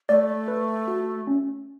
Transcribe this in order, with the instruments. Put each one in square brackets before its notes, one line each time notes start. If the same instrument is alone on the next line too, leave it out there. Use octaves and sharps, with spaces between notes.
[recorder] A3 [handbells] D5
[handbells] B4
F#4
C#4